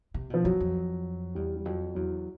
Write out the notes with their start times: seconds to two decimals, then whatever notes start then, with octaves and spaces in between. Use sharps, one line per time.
0.14 C3
0.30 B2 F3
0.44 F#2 F#3
0.60 F2
1.35 E2 G3
1.56 G3
1.65 F2 F#3
1.95 E2 F#3